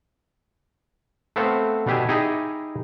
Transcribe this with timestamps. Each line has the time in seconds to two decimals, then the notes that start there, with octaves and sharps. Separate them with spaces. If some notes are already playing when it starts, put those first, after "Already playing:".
1.36 A3 B3 C4 C5 F5
1.87 B2 D4 G4 E5 G#5
2.08 D#4 E4 G4 G#4 D#5